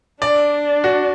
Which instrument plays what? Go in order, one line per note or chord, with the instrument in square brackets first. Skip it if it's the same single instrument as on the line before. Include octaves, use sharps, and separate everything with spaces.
[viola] D4 [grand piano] D5
[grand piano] F#4